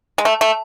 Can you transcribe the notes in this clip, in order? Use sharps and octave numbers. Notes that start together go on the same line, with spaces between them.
G#3
A3
A3